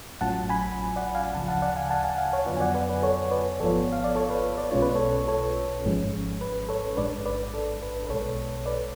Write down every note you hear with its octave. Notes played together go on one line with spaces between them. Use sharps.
A1 A2 F#3 C#4 F4 F#5 A5
G#5 B5
D5 F#5
F5 G#5
D2 C#3 F3 F#5 A5
F#5 A5
D5 F#5
F5 G#5
F#5 A5
F5 G#5
F#5
F5 G#5
C#5 F5
F2 D3 F#3 B3 F4 B4 D5
G#5
D5 F#5
B4 D5
B4
A4 C#5
B4 D5
G#1 G#2 F3 B3 F4 A4 C#5
F5
D5
A4 C#5
B4 D5
D5
B1 B2 G#3 C#4 F4 C#5
B4
A4 C#5
A4 C#5
G#1 G#2 F3 G#3 C#4
B4
A4 C#5
A1 G#2 G#3 D4 B4 D5
B4 D5
A4
B4
B4
B1 B2 G#3 A4 C#5
B4 D5